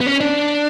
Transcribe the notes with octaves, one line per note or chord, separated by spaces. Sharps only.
B3
C#4
D4